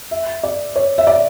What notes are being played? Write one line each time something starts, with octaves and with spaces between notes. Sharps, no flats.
E5
D5
C#5
E5
D5